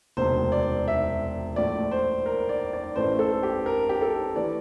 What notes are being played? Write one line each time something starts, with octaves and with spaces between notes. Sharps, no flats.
E1 D2 C3 C5
D5
E5
A#1 A2 F3 A3 D5
C5
A#4
D5
D5
A1 A2 E3 A3 C5
A4
G4
A#4
G4
A4
E3 A3 D5